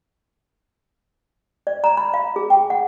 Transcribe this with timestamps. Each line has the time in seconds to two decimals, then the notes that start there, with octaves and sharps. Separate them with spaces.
1.67 D5
1.84 A#5
1.97 B5
2.14 F5
2.36 G#4
2.50 G5
2.70 F#5